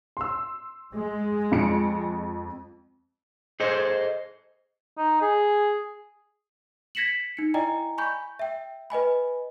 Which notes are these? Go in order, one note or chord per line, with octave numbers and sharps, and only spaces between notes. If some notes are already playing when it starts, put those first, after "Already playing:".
C6 E6
G#3
F2 C#7 D7
G#4 A4 C5 D#5
D#4
G#4
G#6 A#6 B6 C#7 E7 F#7
D#4 C#7
E4 D5 D#5 G5 G#5 A#5
G#5 B5 C#6 G6
E5 G5
B4 D#5 G#5 B5